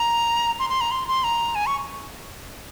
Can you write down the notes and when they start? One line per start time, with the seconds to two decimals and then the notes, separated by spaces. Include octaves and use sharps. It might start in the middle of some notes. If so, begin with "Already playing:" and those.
Already playing: A#5
0.59 C6
0.70 C6
0.81 A#5
0.91 C6
1.08 C6
1.24 A#5
1.55 G#5
1.66 C#6